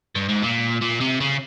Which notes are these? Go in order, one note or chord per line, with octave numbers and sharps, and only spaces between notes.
G2
G#2
A#2
A#2
C3
C#3